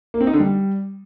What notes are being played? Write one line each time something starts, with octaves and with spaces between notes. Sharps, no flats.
A#3
C4
D#4
D3
G3